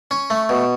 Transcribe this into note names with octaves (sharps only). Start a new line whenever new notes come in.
C#4
A3
B2